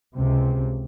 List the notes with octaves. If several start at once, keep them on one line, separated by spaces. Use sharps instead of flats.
C#2 C3